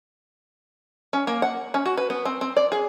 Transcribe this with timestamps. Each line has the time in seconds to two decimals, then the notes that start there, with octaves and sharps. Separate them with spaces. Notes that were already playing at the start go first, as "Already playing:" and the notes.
1.13 C#4
1.27 A#3
1.42 F#5
1.74 C#4
1.86 F#4
1.97 B4
2.10 B3
2.25 C4
2.41 C4
2.57 D5
2.72 G#4